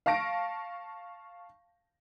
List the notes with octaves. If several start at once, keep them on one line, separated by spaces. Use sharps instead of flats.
F5 A5 C#6 A#6 D7